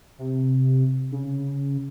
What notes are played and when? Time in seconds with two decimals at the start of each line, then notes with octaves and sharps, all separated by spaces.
0.18 C3
1.11 C#3